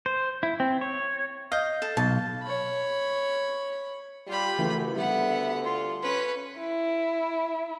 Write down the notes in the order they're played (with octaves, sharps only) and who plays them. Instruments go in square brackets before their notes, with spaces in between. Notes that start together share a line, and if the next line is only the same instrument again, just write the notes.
[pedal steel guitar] C5
E4
C4
C#5
[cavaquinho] D#5 [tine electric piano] F5 G6
[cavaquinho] A4
[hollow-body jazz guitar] B1 [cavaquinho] A5
[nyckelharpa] C#5 B5
[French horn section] G3 [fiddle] F4 B5 [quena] G4
[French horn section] F#2 [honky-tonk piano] C#3 E3 A3
[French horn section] D2 D3 [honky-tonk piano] G3 [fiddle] B3 F#5 [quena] E5
[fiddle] F4 [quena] C6
[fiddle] C#4 B4
[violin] E4